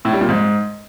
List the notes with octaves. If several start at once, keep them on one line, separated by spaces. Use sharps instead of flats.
A2
G3
A#2
G#2